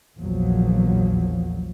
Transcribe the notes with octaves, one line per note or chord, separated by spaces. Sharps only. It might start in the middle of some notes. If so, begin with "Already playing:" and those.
A#1 E2 A#2 F3 F#3